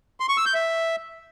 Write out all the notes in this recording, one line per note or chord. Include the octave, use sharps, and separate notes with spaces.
C6
C#6
E6
G6
E5